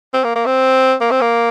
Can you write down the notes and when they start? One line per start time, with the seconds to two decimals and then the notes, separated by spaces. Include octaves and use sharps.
0.14 C4
0.24 A#3
0.35 A#3
0.46 C4
1.01 A#3
1.11 C4
1.21 A#3